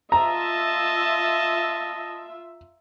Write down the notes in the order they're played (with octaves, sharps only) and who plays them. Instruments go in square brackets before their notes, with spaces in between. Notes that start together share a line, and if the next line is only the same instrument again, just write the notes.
[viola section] F4 E5 [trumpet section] D#5 A5 [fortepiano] A#5